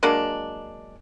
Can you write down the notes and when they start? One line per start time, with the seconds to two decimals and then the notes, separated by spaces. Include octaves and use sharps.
0.03 F#3 G#3 A#3 D4